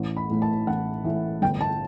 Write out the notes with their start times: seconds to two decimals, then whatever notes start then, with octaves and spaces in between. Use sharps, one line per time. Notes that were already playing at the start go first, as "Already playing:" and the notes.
Already playing: A1
0.17 B5
0.30 A2 E3 A3
0.42 A5
0.67 A1 F#5
1.04 A2 E3 A3
1.42 G1 G5
1.61 A5